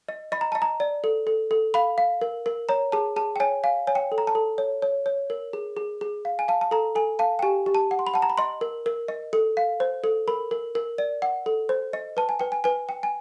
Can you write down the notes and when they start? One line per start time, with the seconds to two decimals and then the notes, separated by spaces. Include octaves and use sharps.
0.09 D#5
0.32 D#5 B5
0.41 A#5
0.52 D#5 A5
0.62 A#5
0.80 D5
1.04 A4
1.27 A4
1.51 A4
1.74 F5 B5
1.98 F5
2.21 A#4
2.46 A#4
2.69 C#5 A#5
2.92 G#4 A5
3.16 G#4 A5
3.36 G5
3.40 C#5 G#5
3.64 F5 G#5
3.87 C#5 G#5
3.95 G5
4.12 A4
4.18 A#5
4.27 A5
4.35 A4
4.58 C#5
4.82 C#5
5.06 C#5
5.30 A#4
5.53 G#4
5.77 G#4
6.01 G#4
6.25 F5
6.39 G#5
6.48 F5 A5
6.61 A5
6.71 A4 A#5
6.95 A4 G#5
7.19 F5 A5
7.39 G5
7.43 G4 G#5
7.66 G4
7.75 A5
7.91 F#5
7.99 C6
8.07 B5
8.14 F#5 A5
8.22 A#5
8.30 B5
8.38 D#5 C6
8.61 A#4
8.86 A#4
9.08 D#5
9.33 A4
9.57 F5
9.80 C5
10.04 A4
10.28 A#4 B5
10.51 A#4
10.75 A#4
10.98 D5
11.22 F#5
11.46 A4
11.69 C5
11.93 D#5
12.17 B4 A5
12.29 G#5
12.40 B4 G5
12.52 G#5
12.64 B4 G#5
12.89 G5
13.03 G#5